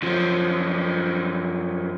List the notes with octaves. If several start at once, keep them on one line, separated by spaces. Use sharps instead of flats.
F#2 F3